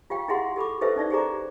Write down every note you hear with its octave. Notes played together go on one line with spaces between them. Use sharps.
F4 G4 F5 G5
E4 G4 G#4 E5 F#5 C6
G4 A4 B5 D6
E4 G4 A4 B4 C5 E5
C#4 D#4 D5 E5
G4 G#4 C5 D5 A#5 D6